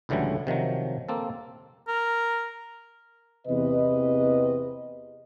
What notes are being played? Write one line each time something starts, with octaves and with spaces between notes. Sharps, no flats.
C#2 A2 D3 E3 F#3 G3
C3 D#3 F3 F#3
A#3 C4 A4
A#4
E2 C3 B4 D#5